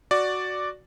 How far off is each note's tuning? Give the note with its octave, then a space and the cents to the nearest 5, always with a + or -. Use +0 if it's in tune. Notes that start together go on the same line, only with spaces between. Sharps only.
F#4 +0 D5 +0